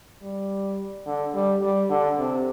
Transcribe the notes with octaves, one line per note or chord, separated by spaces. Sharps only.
G3
D3
G3
G3
D3
C3